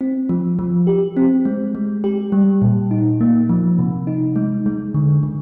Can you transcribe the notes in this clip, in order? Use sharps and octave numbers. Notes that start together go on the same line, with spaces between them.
C4
F3
F3
G4
C4
G#3
G#3
G4
G3
A#2
D#4
A#3
F3
C3
D#4
G#3
G#3
D3
D3